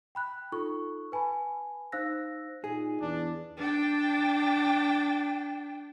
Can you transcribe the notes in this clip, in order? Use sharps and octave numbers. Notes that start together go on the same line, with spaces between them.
G5 B5 F#6
D#4 F4 A4 C#6
B4 G#5 A5 B5
D#4 C5 F5 E6 F#6 A#6
A#2 D#4 G#4
E2 D4
D4 G5